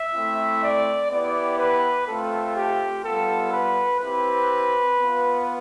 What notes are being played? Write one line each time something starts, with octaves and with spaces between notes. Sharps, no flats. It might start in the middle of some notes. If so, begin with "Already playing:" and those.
Already playing: E5
A3 C4 E4
D5
B3 E4 G4 D5
B4
A3 C4 F4 A4
G4
G3 B3 F4 A4
B4
C4 E4 G4 B4
B3 F4